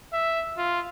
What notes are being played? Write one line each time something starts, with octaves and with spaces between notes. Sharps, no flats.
E5
F4